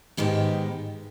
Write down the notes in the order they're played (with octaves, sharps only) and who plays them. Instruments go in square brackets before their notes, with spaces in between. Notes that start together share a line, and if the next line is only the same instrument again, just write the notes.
[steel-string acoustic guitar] G#2 D#3 G#3 B3 G4